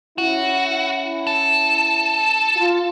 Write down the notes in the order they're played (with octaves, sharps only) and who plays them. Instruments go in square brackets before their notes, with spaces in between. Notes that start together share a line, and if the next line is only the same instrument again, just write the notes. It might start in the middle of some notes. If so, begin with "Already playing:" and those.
[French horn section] C#4 E4 [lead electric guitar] F#4
[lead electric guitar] A4
[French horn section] F4